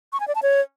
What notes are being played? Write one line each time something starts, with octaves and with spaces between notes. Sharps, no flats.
C#6
G#5
D5
A5
C#5